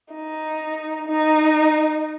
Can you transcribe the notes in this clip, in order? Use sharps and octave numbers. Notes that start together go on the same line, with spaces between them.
D#4
D#4